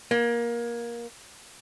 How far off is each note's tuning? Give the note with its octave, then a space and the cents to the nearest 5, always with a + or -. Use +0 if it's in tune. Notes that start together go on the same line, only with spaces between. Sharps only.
A#3 +20